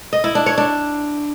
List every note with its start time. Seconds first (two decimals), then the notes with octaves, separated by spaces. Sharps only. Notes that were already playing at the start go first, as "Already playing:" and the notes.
0.13 D#5
0.24 E4
0.35 D4
0.46 C#5
0.58 D4